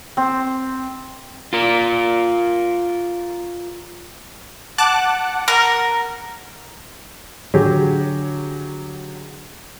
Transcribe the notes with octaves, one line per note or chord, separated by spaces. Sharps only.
C4
F4 A#4
F#5 A5 D6 F#6
A#4
D3 F#3 G4 G#4